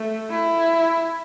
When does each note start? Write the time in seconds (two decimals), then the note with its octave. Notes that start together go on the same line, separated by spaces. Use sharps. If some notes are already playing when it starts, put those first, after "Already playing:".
Already playing: A3
0.31 E4